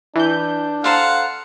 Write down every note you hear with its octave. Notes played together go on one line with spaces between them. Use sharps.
E3 D4 G6
A4 C5 F5 F#5 A#5